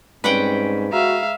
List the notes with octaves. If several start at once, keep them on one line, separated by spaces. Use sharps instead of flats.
G#2 G3 C4 C#4 B4 F#5 G5
G#3 F#4 E5 F5 A#5